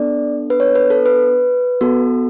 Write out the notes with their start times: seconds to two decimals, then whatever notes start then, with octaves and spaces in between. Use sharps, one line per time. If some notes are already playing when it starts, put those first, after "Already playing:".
Already playing: B3 D4 A4 D5
0.50 B4
0.60 C#5
0.75 B4
0.90 A4
1.06 B4
1.81 B3 F#4 A4